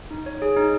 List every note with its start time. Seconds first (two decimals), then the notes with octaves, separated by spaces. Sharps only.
0.11 D#4
0.26 C#5
0.42 G#4
0.56 D#4